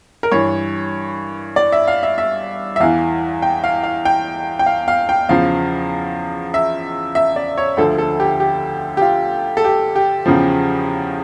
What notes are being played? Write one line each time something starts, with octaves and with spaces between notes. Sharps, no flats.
A#4
G2 E3 C#5
D5
E5
F5
E5
E5
E5
E2 E3 F5
G5
F5
F5
G5
G5
F5
F5
G5
E2 C#3 F3 F5
E5
E5
D5
C#5
D2 D3 F3 A4
A4
G4
G4
G4
F4
A4
G4
G4
E2 C#3 F3